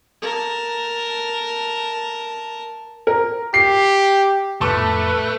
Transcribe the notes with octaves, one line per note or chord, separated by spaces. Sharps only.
A#4 A5
A#4
G4 C7
F2 A2 A3 B3 B4 A5 D6 E6